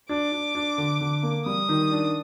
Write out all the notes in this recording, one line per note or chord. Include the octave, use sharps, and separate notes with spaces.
D4 D6
D4
D4
D3
D3
A#3
G3 D#6
D#3
D4